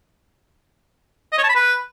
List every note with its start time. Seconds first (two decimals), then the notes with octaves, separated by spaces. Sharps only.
1.32 D#5
1.38 C#5
1.44 A5
1.49 B5
1.55 B4